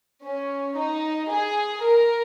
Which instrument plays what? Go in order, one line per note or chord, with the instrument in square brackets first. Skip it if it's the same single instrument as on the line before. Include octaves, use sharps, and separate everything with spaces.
[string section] C#4
D#4
G#4
A#4